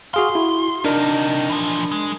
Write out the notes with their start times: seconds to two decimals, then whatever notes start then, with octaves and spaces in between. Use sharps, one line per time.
0.14 F#4 G#4 F5 C6
0.35 E4 F#4
0.85 C3 D4 D#4 A#4
1.50 E3 F3
1.92 G#3